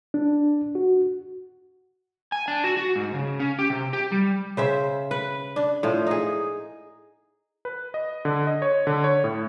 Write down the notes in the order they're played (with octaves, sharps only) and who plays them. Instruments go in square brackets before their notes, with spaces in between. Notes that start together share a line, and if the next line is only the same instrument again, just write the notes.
[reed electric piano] D4
F#4
[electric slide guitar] G#5
D4
F#4
F#4
G#2
C#3
C#4
G4
C3
G4
G3
[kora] C#3 C5 E5
B4
D4
A2 F3
D#4 G#4
[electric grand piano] B4
D#5
D3
D#5
C#5
D3
C#5
A2